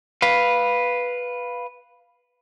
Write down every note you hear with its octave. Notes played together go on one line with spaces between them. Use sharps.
B4 F5